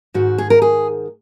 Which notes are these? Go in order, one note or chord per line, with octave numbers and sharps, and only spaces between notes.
G#2 D#3 F#4
G#4
A#4
G#4